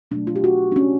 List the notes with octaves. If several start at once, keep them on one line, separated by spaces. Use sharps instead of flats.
B2 F#3 A3 D4
F4
G4
F#4
D4
C#4